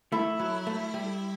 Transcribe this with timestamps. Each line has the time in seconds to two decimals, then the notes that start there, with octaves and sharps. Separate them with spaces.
0.12 A3 E4
0.40 F#3
0.67 A3
0.94 G3